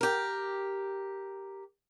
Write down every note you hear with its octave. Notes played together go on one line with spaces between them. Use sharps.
G4 A#4